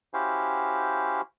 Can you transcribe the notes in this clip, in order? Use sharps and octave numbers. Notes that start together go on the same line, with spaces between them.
C#4 E4 F#4 G4 C5 F5